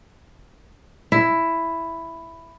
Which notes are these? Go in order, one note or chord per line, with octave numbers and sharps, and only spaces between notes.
E4